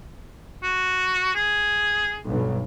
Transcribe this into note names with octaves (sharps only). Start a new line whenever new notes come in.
F#4
G#4
B1 G2